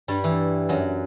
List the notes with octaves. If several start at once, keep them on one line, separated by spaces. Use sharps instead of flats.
G2 G3
E3
F#2 F#3